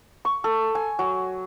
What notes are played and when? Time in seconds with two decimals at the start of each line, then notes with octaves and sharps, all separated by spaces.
0.25 C#6
0.44 A4
0.75 G#5
0.99 F#3